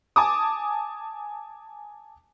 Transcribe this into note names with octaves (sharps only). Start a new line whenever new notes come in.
G#5 A5 D6 D#6